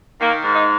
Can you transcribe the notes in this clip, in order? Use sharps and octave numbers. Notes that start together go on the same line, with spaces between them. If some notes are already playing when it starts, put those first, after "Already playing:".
D#3 A#3
G#2
D#4